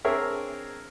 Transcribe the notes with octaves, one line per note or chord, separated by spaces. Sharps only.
C4 D4 G#4 A#4 C#5 E5